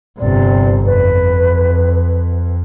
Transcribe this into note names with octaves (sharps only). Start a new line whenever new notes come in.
G1 C3 D5
F2 B4